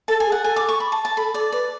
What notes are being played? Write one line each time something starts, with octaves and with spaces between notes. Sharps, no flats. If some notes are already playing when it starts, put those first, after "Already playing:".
A4 A5
G#5
G#4
F#5
A4 G#5
D6
C#6
B5
A5
A5
A4 B5
A4 D5
B4 D5